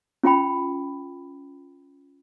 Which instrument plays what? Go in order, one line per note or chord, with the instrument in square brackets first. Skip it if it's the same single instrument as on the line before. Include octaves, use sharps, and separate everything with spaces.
[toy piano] C#4 F4 F#5 G5 B5